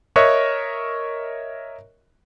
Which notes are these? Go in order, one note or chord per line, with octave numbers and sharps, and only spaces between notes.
A#4 C#5 D#5 E5 C#6 F#6